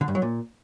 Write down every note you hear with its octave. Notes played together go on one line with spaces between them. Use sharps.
D3
G2
F#3
A#2